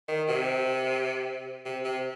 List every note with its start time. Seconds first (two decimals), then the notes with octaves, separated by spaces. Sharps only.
0.08 D#3
0.29 C3
1.66 C3
1.85 C3